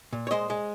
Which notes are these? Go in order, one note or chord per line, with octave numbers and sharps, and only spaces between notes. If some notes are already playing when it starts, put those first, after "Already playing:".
A#2
C#5
G#3 C5 D#5
G#3